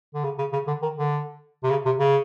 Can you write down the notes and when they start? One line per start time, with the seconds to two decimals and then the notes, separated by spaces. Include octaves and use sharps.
0.14 D3
0.24 C#3
0.38 C#3
0.53 C#3
0.67 D3
0.82 D#3
0.97 D3
1.63 C3
1.70 C#3
1.85 C3
1.99 C#3